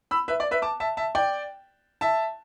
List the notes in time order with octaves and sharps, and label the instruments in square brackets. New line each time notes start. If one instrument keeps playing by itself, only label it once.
[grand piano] B5 E6
B4 E5
D5
B4 E5
A5 D6
E5 A5
E5 A5
D5 G5
E5 A5